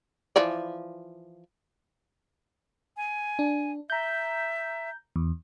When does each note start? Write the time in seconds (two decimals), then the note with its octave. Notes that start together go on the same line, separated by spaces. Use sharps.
0.36 E3 F3 D5
2.97 G#5
3.39 D4
3.90 E5 A#5 G6
5.16 E2